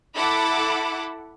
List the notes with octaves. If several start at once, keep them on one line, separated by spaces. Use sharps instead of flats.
E4 A4 F#5 B5 D6